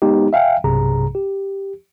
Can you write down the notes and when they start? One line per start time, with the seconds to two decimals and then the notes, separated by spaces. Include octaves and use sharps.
0.02 G#3 B3 D#4 G4
0.33 E5 F5 G5 G#5
0.64 B1 G2 C3 G#4 A#5
1.15 G4